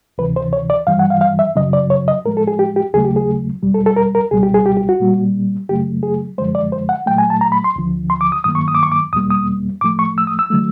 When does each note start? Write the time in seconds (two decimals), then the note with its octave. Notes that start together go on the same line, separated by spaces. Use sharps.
0.18 D2 C3 E3 B4
0.36 C5
0.53 C#5
0.70 D5
0.87 G2 E3 G3 F5
0.99 F#5
1.10 F5
1.21 F5
1.39 E5
1.56 F#2 C#3 F#3 D#5
1.73 D5
1.90 C#5
2.08 D#5
2.25 A2 F3 G#3 A#4
2.37 A4
2.48 G#4
2.59 G4
2.76 G4
2.93 D#2 C#3 F#3 A3 G#4
3.05 G4
3.16 G#4
3.62 E2 B2 G3
3.74 A4
3.86 A4
3.96 A#4
4.15 A#4
4.31 C#2 B2 G3 G#4
4.43 G4
4.54 G#4
4.66 G4
4.77 G4
4.89 F#4
5.00 A#2 G3 A#3
5.69 F#2 C#3 F#3 A3 G4
6.03 G#4
6.38 F#2 D3 F3 G#3 C5
6.55 D5
6.72 C5
6.89 F#5
7.06 A#2 F#3 A3 G5
7.18 G#5
7.30 A5
7.41 A#5
7.52 B5
7.64 C6
7.76 D2 D3 F3
8.10 C6
8.21 D6
8.32 D#6
8.44 G2 D#3 F#3 A#3 D#6
8.55 C#6
8.68 D#6
8.75 D6
8.83 C#6
8.92 D6
9.13 E2 B2 G3 A#3 D#6
9.30 D#6
9.81 A2 F3 A3 D6
9.99 C#6
10.18 E6
10.27 D#6
10.39 E6
10.50 D3 F#3 A3